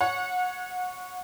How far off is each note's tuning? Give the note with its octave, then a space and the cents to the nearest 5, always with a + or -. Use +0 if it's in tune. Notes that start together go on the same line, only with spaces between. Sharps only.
C#5 +0 F#5 -30